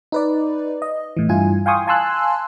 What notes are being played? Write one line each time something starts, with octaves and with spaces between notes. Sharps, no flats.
D#4 B4 D5
D#5
A2 E3
G2 E4 F4 G#5
F5 G5 G#5 C6 C#6 D#6
F5 G#5 A5 C6 E6 F#6